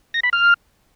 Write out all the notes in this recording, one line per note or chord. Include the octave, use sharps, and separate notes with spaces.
A#6
B5
F6